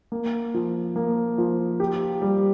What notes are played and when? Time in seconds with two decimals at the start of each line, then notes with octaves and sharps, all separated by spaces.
0.12 A#3
0.54 F3
0.96 A#3
1.38 F3
1.80 G4
2.22 G3